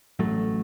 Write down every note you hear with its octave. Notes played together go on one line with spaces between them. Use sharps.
A1 A2 F#3 A3